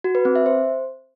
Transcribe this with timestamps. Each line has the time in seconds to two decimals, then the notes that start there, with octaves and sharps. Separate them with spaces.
0.04 F#4
0.15 B4
0.25 C4
0.35 E5
0.46 C5